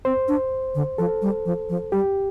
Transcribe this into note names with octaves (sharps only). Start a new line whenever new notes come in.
C4 C5
D4
D3
F3 A4
G3
F3
F3
G3 G4